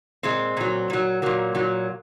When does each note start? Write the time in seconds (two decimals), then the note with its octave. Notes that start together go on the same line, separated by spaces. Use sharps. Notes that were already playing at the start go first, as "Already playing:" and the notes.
0.23 A#2 G#3 C4
0.57 A#2 F#3
0.90 A#2 F#3
1.22 A#2 F#3 A#3
1.55 A#2 F#3